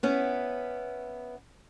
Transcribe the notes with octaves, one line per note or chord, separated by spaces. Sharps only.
B3 C#4 E4